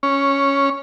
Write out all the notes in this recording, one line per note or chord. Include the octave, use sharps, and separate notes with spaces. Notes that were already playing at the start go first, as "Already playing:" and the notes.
C#4